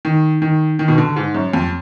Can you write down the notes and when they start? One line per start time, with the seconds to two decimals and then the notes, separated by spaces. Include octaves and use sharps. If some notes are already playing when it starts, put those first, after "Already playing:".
0.05 D#3
0.42 D#3
0.79 D#3
0.88 B2
0.98 D3
1.16 G#2
1.34 F#2
1.53 F2